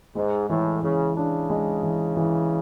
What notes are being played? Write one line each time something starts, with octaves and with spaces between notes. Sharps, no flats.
G#2 G#3
A2 E3
C#3 E3
C#3 D4
G#3
E3
E3